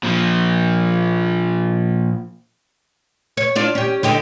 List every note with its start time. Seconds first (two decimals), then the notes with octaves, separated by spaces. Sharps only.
0.03 A#2 F3
3.37 C#5
3.55 D4 F4 D5
3.75 C#4 G4
4.03 D3 D#4 G4